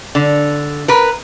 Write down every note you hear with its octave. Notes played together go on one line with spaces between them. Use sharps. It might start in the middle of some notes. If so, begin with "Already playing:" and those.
D3
A#4 B4